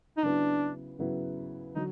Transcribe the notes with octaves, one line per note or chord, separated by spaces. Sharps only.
D#4
C#3 F#3 B3 D4 E4
C#3 F#3 B3 E4
D3 F#3 D#4